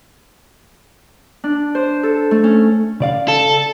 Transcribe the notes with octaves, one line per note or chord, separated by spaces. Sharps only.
D4
C5
A4
A3
C#4
C#3 D5 F5
A4